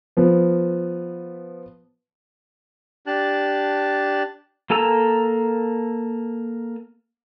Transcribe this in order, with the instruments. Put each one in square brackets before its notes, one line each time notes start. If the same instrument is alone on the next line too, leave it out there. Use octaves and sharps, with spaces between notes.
[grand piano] F3 B3
[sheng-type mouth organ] D4 G4 A5 F#6
[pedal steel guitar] A#3 A4 G#5 A#5 E6